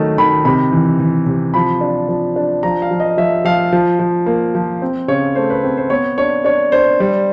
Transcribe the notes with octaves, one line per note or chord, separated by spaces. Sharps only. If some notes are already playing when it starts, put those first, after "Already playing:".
Already playing: D#3 F#3 A3 D#5 A5
D#3 B5
C3 B5
E3
E3
C3
F3 B5
D4
F3
D4
F3 A#5
F5
F3
D#5
F3 E5
F3 F5
F3
F3
A#3
F3
C4
C#3 C#5
A3 C5
B4
C4
C5
B3 C#5
D4 C#5
D4 C#5
D4 C5
G3